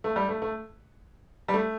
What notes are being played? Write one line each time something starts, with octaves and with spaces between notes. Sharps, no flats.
A3
G3
A3
A3
G3
A3